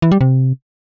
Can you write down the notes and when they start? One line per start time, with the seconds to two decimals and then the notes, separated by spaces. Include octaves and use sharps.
0.02 E3
0.11 G3
0.21 C3